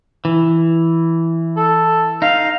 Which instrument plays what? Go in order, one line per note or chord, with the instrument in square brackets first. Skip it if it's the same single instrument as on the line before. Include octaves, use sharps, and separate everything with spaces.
[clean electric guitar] E3
[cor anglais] A4
[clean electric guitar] D#4 [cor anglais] F5